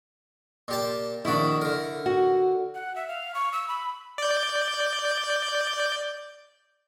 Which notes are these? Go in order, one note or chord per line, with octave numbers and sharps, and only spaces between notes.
A#2 G4 A5
A#1 D#3 D4 E4 F#4
D3 A#4
F#4
F#5
E5
F5
C#6
E6
B5
D5 G6